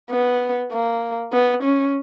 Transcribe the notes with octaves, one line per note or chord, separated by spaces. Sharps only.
B3
A#3
B3
C#4